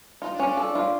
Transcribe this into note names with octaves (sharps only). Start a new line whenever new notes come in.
D#4 F4
D4
C#4
D4
A4
F4